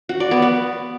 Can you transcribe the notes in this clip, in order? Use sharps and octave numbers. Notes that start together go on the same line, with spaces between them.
F#4
D5
B3
B3